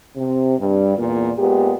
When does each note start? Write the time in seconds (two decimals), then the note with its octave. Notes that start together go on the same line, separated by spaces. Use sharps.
0.15 C3
0.58 G2
0.96 E2 A#2
1.37 A#2 G#3 B3 G4